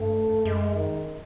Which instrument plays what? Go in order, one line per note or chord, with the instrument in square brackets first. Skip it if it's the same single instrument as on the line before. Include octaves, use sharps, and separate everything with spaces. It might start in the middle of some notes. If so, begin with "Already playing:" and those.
Already playing: [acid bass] G2 [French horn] A3
[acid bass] F#2 [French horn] G#3
[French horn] D#3